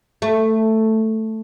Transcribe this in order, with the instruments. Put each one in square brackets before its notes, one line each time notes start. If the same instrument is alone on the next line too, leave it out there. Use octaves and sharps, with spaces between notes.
[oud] A3